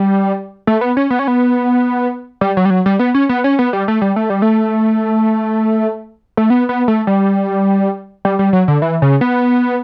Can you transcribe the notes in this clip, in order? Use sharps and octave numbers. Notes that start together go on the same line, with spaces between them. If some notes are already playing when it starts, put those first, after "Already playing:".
Already playing: G3
A3
B3
C#4
B3
C#4
B3
G3
F#3
G3
F#3
G3
B3
C#4
B3
C#4
B3
G3
A3
G3
A3
G3
A3
A3
B3
B3
A3
G3
G3
G3
F#3
D3
E3
C#3
B3